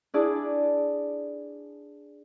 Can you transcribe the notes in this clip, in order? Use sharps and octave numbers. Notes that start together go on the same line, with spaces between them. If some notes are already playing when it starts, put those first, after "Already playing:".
D4 E4 G#4 D5